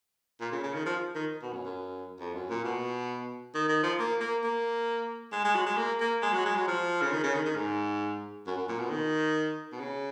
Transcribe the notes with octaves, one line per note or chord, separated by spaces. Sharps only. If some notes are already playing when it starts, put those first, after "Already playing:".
A#2
C#3
C#3
D#3
F3
D#3
B2
F#2
F#2
F2
F#2
A#2
B2
D#3
D#3
F3
A#3
A#3
A#3
G#3
G#3
F#3
G#3
A#3
A#3
G#3
F#3
G#3
F#3
F3
C#3
D#3
C#3
D#3
D#3
G#2
F#2
F#2
A#2
B2
D#3
B2
C#3